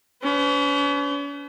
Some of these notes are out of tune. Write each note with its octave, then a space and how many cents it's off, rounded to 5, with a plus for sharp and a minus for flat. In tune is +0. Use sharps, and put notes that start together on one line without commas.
C#4 +45 B4 +45